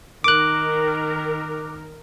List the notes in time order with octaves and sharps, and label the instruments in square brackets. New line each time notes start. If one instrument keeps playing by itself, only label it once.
[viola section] D#3 A#4 [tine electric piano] D6 F#6